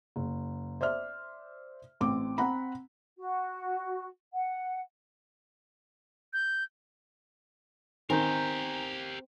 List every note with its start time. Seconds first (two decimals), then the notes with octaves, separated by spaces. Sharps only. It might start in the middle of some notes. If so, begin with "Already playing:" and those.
0.16 F#1
0.81 C5 D5 E5 F6
2.01 A1 C4 D6
2.38 C4 F#5 A#5 B5
3.18 F#4
4.33 F#5
6.33 G6
8.10 D#3 C4 G4 A#4 G#5 A#5 G6